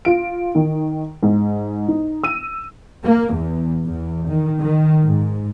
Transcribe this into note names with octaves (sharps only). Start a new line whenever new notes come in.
F4 D7
D#3
G#2
D#4
E6 D#7
A#3
E2
E2
D#3
D#3
G#2